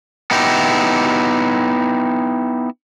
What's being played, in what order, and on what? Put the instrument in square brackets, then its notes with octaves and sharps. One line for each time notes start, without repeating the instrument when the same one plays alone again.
[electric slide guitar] B3 D#4 E4 G4